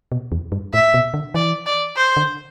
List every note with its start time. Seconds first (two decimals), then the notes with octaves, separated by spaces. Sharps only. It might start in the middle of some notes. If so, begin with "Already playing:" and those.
0.12 B2
0.32 E2
0.52 G2
0.74 A2 E5
0.94 B2
1.14 D3
1.34 E3 D5
1.66 D5
1.97 C5
2.17 D3